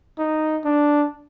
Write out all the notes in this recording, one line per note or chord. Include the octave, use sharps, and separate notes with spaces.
D#4
D4